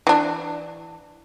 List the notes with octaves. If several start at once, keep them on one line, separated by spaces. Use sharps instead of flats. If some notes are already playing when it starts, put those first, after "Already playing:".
E3 D4